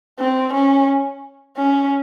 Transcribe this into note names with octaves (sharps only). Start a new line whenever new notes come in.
C4
C#4
C#4